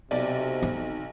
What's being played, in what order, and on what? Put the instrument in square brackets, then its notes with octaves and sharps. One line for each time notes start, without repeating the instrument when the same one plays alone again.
[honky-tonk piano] B1 [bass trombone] C3 [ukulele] D5
[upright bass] D#4